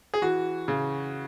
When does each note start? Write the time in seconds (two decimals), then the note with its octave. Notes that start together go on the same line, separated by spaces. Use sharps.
0.14 G#4
0.22 E3 F#4
0.68 C#3